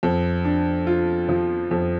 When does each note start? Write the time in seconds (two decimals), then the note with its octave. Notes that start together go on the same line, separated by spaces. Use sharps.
0.03 F2
0.45 D4
0.87 F4
1.29 F3
1.71 F2